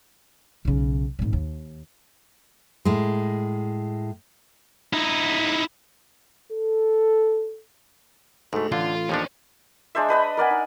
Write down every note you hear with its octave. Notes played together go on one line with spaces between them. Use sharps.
B1 C#3
G#1 A#2
D#2
A2 G#3
D#4 E4
A4
D2 G#2 A3
A1 D3 F4
D#2 F3 C#4 D4
G#3 D4 C5 E5
D4 B4 D#5 B5
A#4 D5 F#5 G#5
D#4